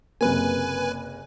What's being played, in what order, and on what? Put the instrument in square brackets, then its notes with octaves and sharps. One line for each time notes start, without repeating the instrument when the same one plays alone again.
[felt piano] F#1 C3 A#3 [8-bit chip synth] B4 G#5